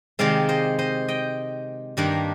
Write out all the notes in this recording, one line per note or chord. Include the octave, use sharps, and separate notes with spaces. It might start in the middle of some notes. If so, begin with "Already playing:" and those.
C3 D#3 G#3 C4 D5 F5
C5 D#5
C5 D#5
D#5 G5
G2 D#3 G3 A#3 D4